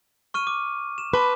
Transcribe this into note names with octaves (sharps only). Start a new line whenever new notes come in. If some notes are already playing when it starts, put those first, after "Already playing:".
C#6 F6 D#7
D6
E7
B4 A5 C6 D6